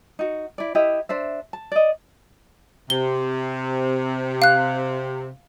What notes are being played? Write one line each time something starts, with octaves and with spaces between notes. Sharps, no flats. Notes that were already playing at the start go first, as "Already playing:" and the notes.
D#4 F#4
E4 D5
E4 G4 D#5 E5
D4 C5 E5
A5
D5 D#5
C3 G7
F5 F#6